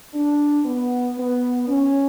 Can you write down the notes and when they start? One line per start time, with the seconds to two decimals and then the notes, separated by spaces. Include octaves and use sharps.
0.14 D4
0.66 B3
1.18 B3
1.69 C#4